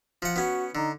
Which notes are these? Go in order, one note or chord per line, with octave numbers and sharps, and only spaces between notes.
F3 F#5
B3 C#4 F#4
D3 D#4